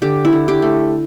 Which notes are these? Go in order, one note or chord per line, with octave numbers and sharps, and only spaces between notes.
D3 G4
E4
D3
G4
A3